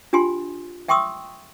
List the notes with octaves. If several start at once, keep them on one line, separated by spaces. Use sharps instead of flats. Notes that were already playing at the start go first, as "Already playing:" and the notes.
D4 F4 G4 G#5 C6
E5 G5 C6 C#6 D#6 E6